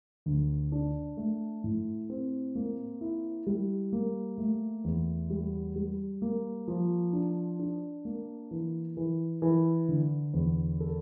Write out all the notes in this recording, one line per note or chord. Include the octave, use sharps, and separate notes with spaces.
D2
D4
A3
A2
C4
A#3
E4
G3
A#3
A3
E2
G3
G3
A#3
F3
D4
D4
A#3
E3
E3
E3
D3
E2
A4